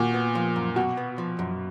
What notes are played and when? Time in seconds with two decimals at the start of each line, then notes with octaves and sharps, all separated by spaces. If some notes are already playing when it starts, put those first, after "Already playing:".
Already playing: A#2 F#4
0.14 B3
0.35 F3
0.56 F#2
0.76 B2 F#4
0.97 B3
1.18 F3
1.39 F#2